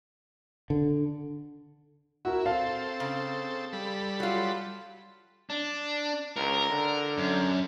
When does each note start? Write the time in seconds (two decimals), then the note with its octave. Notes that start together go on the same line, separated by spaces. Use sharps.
0.70 D3
2.25 E4 F#4 A#4
2.46 C4 A4 F5 A5
3.00 C#3
3.73 G3 A4 B5
4.20 F#3 F4
5.50 D4
6.37 C#2 A#4
6.70 D3
7.18 F#2